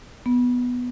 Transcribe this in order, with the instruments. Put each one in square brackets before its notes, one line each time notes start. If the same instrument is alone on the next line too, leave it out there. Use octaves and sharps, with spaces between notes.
[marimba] B3